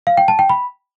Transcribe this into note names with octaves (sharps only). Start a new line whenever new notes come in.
F5
G5
A5
G5
B5